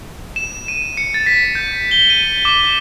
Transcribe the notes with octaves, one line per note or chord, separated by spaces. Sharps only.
E7
D#7
C#7
A6
B6
G6
G7
D#7
D6